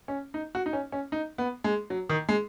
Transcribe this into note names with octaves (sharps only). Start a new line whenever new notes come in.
C#4
D#4
F#4
D#4
C#4
C#4
D#4
B3
G#3
F#3
D#3
G#3